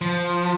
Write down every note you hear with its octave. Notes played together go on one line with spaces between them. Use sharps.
F3